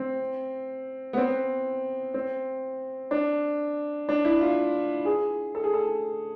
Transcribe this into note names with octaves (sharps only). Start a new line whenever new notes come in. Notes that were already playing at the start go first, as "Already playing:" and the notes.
Already playing: C4
B3
C4
C4
D4
D4
E4
F4
G#4
A4
G#4
A4